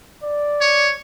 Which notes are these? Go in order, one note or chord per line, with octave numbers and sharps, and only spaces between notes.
D5
C#5